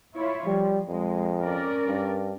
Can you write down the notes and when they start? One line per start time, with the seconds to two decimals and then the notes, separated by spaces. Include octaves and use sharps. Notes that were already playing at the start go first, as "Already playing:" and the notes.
0.15 E4 F4 C#5
0.47 F3 G3
0.89 F2 G#3
1.41 C#4 A#4 D5
1.87 G2